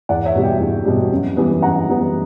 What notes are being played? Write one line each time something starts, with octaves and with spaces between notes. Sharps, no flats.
E2 D5 F#5
C#5 E5
B2 G3
E5 G5
E2
B2 G3
F#2
E3 G3 B3
F#2 F#5 A#5
E3 G3 B3